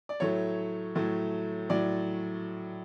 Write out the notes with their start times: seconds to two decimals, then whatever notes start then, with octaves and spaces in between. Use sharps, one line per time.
0.09 D5
0.20 A2 F#3 A3 C#5
0.95 A2 F#3 A3
1.69 A2 F#3 D5